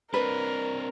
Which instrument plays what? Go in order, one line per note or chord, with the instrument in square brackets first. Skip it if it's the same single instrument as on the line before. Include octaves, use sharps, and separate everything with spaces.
[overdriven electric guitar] C4 D4 [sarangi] A#4 [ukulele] B4